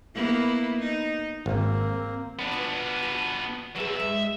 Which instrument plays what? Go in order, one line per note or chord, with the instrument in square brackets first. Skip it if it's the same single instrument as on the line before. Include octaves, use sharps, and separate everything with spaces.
[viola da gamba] A#3 B3 E4
D#4
[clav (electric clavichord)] G#1 [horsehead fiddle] A#3 C4
[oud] F3 [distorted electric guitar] B3 D4
[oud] F4 F#4 B4
F4 F#4
[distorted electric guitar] F#3 E5 [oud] B3 G#4
[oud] G#2 G#3 [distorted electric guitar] E5